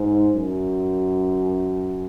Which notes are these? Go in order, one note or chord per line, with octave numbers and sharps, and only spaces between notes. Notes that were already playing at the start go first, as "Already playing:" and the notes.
Already playing: G#2
F#2